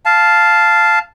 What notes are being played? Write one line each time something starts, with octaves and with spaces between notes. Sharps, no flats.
F5 A5